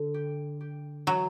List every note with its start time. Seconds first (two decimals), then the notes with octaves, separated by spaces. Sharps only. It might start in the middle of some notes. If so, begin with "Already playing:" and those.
Already playing: D3
0.14 G4
0.61 G4
1.07 E3 F#3